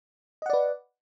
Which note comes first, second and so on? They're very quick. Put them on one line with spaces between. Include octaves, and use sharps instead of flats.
D#5 F#5 D5 B4